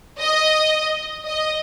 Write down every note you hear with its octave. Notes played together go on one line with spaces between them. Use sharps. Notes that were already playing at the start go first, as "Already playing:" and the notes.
D#5
D#5